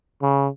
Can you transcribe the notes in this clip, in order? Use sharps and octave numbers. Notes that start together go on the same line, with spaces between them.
C#3